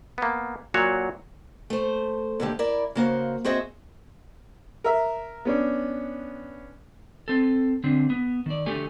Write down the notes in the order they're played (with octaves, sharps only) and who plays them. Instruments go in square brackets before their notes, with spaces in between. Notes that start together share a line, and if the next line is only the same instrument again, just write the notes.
[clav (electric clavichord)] A#3 B3
A#2 F#3 F#4 C#5
[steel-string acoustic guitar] A3 C5
D#2 G#2 D3 A3 G4
E4 A#4 D5
C#3 A#3 F#4 C5
C4 F#4 G#4 C5 D#5 E5
[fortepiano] A#4 E5
B3 C#4 D4
[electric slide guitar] C4 A4
D3 C4 D4
B3
D#3 D5
D3 A3 G4 A4 G#5